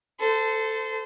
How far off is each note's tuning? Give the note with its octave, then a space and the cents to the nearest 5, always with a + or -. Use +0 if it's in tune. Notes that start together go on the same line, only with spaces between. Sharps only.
A4 +5 C5 -25